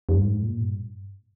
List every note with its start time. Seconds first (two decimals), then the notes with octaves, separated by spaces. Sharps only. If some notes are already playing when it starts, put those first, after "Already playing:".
0.09 F2
0.16 G2
0.23 G#2
0.43 A#2
0.61 G2